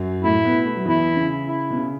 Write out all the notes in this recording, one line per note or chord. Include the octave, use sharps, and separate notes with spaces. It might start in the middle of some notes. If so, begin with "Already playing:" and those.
Already playing: F#2 F#3
A2 A3 E4
B2 B3
A3
F#3
E2 E3 E4
C#3
E4
B2
C#3